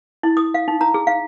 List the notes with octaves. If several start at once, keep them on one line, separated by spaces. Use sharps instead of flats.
E4
D#6
F5
D#4
A#5
G#4
F5